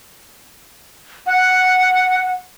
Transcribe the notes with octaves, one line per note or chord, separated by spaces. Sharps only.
F#5